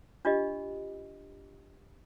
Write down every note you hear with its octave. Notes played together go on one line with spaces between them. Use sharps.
D4 F4 G4 D#5